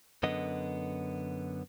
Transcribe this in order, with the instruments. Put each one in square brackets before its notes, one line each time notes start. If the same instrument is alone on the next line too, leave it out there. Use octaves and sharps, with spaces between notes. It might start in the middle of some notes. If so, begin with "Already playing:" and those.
[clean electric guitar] F#2 D3 B3 D#5